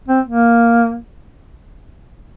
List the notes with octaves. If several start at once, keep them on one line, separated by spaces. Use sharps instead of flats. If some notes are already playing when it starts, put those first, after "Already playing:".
C4
A#3